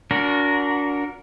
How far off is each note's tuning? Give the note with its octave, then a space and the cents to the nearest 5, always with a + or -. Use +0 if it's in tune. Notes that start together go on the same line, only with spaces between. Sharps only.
D4 -30 F#4 -20 A#4 +0